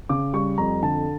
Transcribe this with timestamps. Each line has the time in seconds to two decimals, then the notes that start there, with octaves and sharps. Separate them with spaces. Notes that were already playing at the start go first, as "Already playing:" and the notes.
0.09 C#3 D6
0.33 G3 C#6
0.58 F2 A#5
0.83 D3 A5